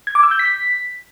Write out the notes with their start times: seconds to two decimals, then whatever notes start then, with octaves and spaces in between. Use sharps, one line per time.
0.07 G#6
0.15 D6
0.23 E6
0.31 G6
0.39 B6